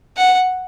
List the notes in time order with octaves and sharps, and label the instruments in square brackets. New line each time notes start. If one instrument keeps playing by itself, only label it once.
[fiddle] F#5